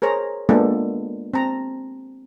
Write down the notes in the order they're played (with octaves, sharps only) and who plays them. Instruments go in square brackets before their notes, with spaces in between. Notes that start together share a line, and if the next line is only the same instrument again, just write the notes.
[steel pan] G#4 A#4 C5 C#5 A#5
G#3 A#3 B3 D4 F4 A4
C4 A5 A#5